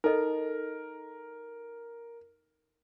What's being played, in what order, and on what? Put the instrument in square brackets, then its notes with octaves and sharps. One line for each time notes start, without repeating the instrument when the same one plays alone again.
[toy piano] D#4 A4 D#5 [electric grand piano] A#4